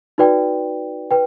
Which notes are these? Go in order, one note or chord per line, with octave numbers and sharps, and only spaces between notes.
D#4 F#4 B4 D5 G5
B4 G5